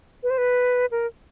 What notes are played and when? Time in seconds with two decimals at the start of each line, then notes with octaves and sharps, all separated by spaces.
0.23 B4
0.30 C5
0.38 B4
0.91 A#4